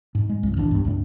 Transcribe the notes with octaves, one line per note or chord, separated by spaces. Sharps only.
G#2
G#3
C2 F#2
D1 A1 E3 D4
B1 G2
C#2 G2 A#2